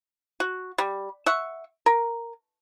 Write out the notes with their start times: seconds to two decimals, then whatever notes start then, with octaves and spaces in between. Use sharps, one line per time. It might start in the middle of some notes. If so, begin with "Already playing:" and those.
0.40 F#4
0.78 G3
1.26 E5 F#5 C#6
1.86 A#4